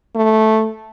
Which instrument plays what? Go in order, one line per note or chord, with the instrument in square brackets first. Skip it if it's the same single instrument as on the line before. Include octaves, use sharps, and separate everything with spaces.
[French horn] A3